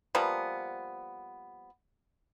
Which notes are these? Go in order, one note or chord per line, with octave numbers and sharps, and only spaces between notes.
F3 G3 A#3 B3